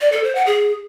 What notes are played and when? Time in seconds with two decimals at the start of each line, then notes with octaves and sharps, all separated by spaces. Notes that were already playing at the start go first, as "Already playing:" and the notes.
0.01 D5
0.12 A4
0.24 C5
0.35 F#5
0.46 G#4